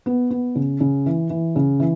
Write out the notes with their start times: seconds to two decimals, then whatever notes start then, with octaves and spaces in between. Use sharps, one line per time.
0.06 B3
0.30 B3
0.55 C#3
0.80 C#3
1.06 E3
1.30 E3
1.56 C#3
1.80 E3